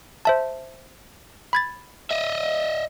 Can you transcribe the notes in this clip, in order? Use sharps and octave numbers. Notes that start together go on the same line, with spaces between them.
C5 E5 A5
B5 G#6 A6
D#5 E5